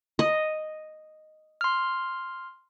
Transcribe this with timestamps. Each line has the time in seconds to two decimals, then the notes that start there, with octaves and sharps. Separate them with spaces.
0.19 D#5
1.61 C6 F6